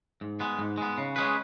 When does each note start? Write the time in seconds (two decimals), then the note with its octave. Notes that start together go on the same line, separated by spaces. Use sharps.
0.21 G#2
0.40 G#3 B3
0.59 G#2
0.78 G#3 B3
0.98 C#3
1.16 G#3 C#4 G#4 B4